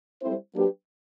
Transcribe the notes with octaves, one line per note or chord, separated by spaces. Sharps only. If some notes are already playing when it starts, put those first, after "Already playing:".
G3 C4 E4 A4 C5
F#3 A#3 D4 G4 B4